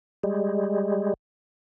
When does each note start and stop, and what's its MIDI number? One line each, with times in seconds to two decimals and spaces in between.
0.23 1.14 55
0.23 1.14 56